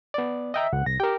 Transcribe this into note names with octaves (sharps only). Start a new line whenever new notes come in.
B3 D5
D#5 E5 G5 A#5
C#2 F#5
C2 A#6
G4 A#4 G5